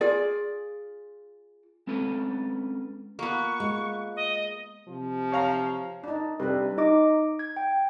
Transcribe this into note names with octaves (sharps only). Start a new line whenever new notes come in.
F4 G#4 D5
G#3 C4 C#4 A4 B4
A#3 B3 F4 C#6
G#3
D#5
C3 F3
C#5 F5 A#5
D4 D#4
C3 G3 D4 A4 B4
D#4 D#5 D6
G#6
G5